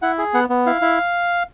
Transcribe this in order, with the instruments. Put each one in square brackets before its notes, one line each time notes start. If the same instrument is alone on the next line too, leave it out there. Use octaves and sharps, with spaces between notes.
[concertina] E4 F#5
G#4
B3 F#5
B3
E4 F5
E4